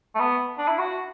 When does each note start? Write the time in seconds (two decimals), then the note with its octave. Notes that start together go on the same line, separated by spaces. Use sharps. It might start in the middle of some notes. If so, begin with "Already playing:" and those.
0.15 A3
0.19 B3
0.58 D4
0.68 E4
0.79 F#4